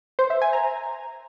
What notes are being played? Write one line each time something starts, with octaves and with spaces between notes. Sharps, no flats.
C5
E5
G#5
A#5